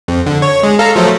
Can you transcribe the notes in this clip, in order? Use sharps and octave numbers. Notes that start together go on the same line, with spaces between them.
F2
D3
C#5
G#3
A4 F5 A#5
F3 F#3 A3